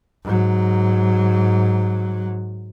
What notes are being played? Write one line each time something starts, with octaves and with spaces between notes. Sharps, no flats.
G#2 F#3